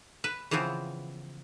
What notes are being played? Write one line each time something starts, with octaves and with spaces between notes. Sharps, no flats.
B4
C#3 E3 F3 B3 C4